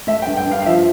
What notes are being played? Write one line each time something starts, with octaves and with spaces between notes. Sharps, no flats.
A3 E5
G2 G5
G5
G2 F5
F5
F3 E5